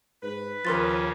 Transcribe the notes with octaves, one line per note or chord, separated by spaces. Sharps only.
G#2 B4
D#2 C#3 F3 A#4 C6 A6